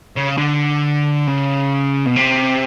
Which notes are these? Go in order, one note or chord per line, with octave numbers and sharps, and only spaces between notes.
C#3
D3
C#3
B2
C3